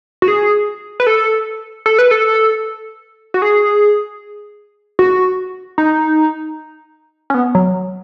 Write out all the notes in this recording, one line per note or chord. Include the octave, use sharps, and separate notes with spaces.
F#4
G#4
B4
A4
A4
B4
A4
F#4
G#4
F#4
D#4
C#4
B3
F#3